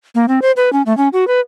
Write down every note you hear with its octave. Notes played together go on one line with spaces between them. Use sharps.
A#3
C4
C5
B4
C#4
A3
C#4
F#4
B4